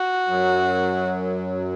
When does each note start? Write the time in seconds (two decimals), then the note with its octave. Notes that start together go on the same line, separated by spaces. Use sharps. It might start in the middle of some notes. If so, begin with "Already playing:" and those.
Already playing: F#4
0.27 F#2 F#3